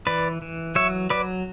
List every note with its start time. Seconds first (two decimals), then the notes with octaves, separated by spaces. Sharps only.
0.07 E3 B4 D5
0.42 E3
0.75 F#3 C#5 E5
1.10 F#3 B4 D5